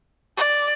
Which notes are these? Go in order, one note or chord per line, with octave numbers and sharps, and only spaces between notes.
D5